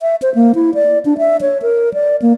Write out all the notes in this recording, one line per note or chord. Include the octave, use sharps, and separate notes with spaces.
E5
C5
A#3
E4
D5
D4
E5
C#5
A#4
D5
A#3